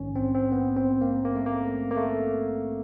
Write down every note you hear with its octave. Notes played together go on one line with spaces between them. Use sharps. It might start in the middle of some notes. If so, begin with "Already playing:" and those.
Already playing: A#1 G#2 D#3 C#4
C4
C4
B3
C4
A#3
A#3
A3
A#3
A#3
A3